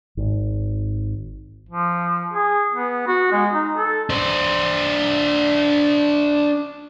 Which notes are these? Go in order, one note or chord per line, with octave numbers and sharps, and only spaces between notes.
G#1
F3
G#4
B3
F#4
G#3
D#4
A4
D4 C5